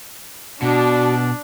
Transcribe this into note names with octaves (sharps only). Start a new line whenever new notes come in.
B2 D4 F#4